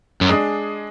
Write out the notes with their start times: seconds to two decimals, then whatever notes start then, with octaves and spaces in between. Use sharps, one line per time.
0.21 F#2
0.29 G#3 D4 G#4